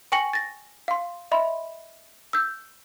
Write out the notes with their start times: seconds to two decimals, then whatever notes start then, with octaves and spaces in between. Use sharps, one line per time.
0.12 G5 G#5 C#6 A#6 C#7 F#7
0.33 A6 A#6
0.88 F5 C6
1.31 D#5 E5 B5 C6
2.33 E6 G6